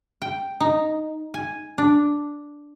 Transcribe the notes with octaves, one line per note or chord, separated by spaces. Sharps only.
G5
D#4
G#5
D4